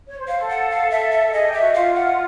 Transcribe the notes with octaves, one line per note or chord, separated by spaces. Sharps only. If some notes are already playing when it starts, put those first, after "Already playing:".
C#5
C5
C5 F5
A4
F#5
F5
A4 E5
E5
A4
G#4 D#5
G4
E5
F#4
F4 F5
F#5